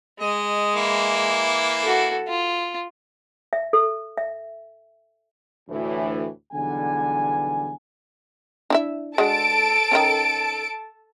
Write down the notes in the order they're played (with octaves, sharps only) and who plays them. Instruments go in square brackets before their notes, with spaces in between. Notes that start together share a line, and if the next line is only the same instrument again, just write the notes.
[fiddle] G#3 [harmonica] D#5
[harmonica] E3 A#3 E4
[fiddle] F#4 A4
F4
[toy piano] E5
A4
E5
[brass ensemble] D2 A2 E3
B1 E2 D3 G3 F#5 G#5
[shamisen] D4 E4 E5
[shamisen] G#3 D4 F#4 [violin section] A4 A5 D7
[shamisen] D#3 E3 C#4